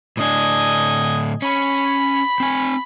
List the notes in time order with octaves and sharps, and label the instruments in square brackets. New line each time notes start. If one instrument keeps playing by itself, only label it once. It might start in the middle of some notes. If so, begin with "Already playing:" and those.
[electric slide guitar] A2 D3 D4 [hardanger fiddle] D#5 G#5
[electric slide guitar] C#4 [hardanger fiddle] B5
[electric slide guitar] C4 G#5